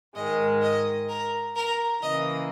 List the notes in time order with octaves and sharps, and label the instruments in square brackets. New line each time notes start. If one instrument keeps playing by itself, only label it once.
[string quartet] G#2 D#3 G#3 [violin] D#5
[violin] D#5
A#4
A#4
[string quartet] C#3 E3 A#3 [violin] D#5